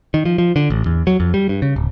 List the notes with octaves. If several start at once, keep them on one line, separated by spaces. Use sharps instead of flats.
D#3
F3
F3
D3
A1
E2
F#3
F2
G3
G2
C#3
D1